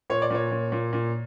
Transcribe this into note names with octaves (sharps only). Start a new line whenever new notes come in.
A#2 C#5
D5
A#2 C#5
A#2
A#2
A#2